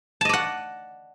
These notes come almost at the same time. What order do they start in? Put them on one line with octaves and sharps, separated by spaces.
A5 D#5 D5 F#5